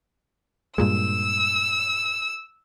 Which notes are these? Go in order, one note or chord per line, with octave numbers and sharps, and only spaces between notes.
G2 A#2 G#3 E6